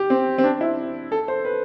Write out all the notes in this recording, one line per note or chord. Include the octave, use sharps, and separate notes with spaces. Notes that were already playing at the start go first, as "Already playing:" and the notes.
Already playing: G4
C4
C4
D4
E4
A4
C5
B4